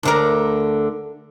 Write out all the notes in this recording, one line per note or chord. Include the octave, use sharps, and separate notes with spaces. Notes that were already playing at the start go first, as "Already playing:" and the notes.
D2 D3 A#4